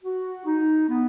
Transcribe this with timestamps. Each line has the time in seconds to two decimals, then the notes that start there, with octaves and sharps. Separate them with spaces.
0.03 F#4
0.45 D#4
0.88 B3